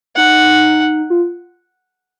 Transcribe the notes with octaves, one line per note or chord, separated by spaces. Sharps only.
D#4 F#5
F4